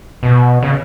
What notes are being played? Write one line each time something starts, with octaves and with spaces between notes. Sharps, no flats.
B2
C#3